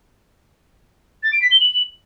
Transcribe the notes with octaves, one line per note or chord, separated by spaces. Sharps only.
A6
D7
B6
G7
F#7